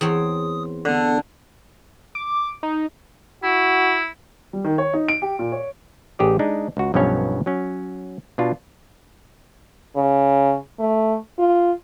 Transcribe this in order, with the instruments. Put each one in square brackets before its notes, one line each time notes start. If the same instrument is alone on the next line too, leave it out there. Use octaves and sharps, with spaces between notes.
[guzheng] E2 C4 C#5 [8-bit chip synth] D#6
[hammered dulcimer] D3 [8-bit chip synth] B3 A4
[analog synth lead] D6
D#4
[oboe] E4 [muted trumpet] F#4
[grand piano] G3
D#3
C#5
D#4
D7
G4
A#2
C#5
[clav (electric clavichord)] A1 G4 G#4 D5
G#3 D4 D#4
C#2 F#4
B1 G2 F3 B3 C#4 C#5
F#3 C#4
B2 D4 F4
[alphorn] C#3
A3
F4